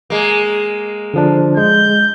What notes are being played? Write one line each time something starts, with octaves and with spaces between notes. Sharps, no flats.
G#3 A#3
D3 F3 D4
G#3 G6